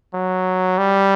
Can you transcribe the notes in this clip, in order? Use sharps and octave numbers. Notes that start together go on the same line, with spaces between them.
F#3
G3